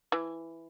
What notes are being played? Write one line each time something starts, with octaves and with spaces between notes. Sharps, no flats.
E3